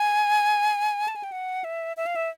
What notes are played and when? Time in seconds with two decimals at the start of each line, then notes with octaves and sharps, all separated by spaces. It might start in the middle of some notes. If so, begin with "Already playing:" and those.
Already playing: G#5
1.08 A5
1.16 G#5
1.23 G5
1.32 F#5
1.64 E5
1.97 E5
2.06 F5
2.16 E5